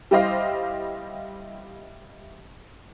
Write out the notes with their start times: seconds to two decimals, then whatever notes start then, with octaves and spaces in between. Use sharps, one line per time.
0.11 G3 E4 G4 C5 D#5 F5